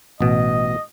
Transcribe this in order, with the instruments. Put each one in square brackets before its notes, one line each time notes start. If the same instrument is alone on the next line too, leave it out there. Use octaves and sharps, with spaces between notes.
[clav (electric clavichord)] A1 B2 [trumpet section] D#5